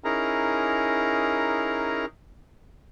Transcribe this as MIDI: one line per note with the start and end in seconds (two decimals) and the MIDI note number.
0.04 2.06 61
0.04 2.06 63
0.04 2.06 64
0.04 2.06 68
0.04 2.06 70
0.04 2.06 82